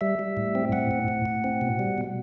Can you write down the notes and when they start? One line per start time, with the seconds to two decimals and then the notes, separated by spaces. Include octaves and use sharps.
0.01 G3 E5
0.19 G3
0.37 A2
0.55 C4
0.72 A2 F#5
0.91 A2
1.08 A2
1.25 A2
1.44 C4
1.61 B2
1.79 G3
1.98 B2